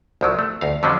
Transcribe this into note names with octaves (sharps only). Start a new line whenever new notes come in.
C2 F3 F#3
A3
D2 F5
F2 D3 F#3 G3 C#4 D4